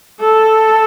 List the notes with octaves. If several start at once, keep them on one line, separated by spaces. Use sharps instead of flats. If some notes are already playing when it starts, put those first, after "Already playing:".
A4